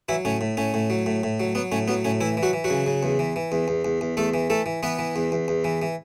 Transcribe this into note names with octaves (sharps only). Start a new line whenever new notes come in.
E3 F#3 E4
A2 C#4
A2
A2 C#4
A2
F#3
A2
A2
F#3
F#3 B3
A2 C#4
F#3 B3
A2 C#4
E3 E4
E3
F#3 F#4
E3
F#3 F#4
C#3
C#3
E2
E3
E3
E2
E2
E2
E2
E2 A3 A4
E3
E3 A3 A4
E3
E3 B3 B4
E3
E2
E2
E2
E3
E3